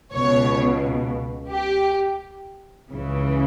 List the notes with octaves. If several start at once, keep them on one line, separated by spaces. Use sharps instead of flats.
C#2 B2 C#5
G4
C#2 C#3 E3